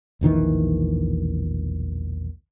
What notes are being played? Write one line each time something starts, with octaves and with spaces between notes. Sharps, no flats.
E1 A#1 D#3 E3